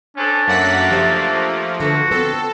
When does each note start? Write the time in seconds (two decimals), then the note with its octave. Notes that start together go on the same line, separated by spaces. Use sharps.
0.17 C#4 D4 A4 C5
0.47 F#2 A3 A#3 F#5 B6
0.91 F3 G4 C5 E5
1.80 D3 F#4 A4 B4
2.11 B3 C4 A4